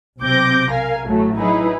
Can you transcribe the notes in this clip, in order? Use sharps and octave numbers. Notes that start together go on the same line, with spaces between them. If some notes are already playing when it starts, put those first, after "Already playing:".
B1 C3 C4 D6 G6 A#6
A#4 F5 G#5
A1 A2 F#3 A3
F#3 D#4 E4 G#4 B4